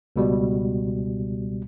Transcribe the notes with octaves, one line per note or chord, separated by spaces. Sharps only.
C#2 B2 G3